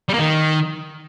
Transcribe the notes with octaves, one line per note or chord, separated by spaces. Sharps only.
G3
A#3
D#3